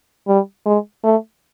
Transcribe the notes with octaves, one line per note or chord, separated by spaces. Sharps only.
G3
G#3
A3